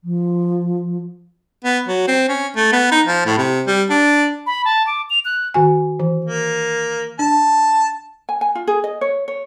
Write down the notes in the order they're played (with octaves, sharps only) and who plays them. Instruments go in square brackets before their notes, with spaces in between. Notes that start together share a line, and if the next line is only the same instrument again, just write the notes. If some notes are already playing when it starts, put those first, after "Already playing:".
[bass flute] F3
[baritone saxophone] B3
F#3
C4
C#4
A3
B3
D#4
F3
A2
C3
G3
D4
[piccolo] B5
A5
D6
F7
F#6
[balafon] D#3 F#4 G#5
E3
[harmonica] A#3
[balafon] D4 [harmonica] A5
[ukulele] G#5
G#5
F4
G#4
D#5
C#5
C#5